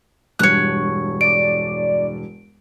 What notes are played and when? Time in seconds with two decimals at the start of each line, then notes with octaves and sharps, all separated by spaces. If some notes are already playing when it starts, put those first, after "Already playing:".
0.39 E1 G2 C#5 F#6
1.21 D5 D7